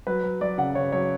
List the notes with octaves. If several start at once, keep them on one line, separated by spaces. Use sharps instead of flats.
F#3 B4
F#3
F#3 D5
C#3 F#5
C#3 C#5
F#3 C#5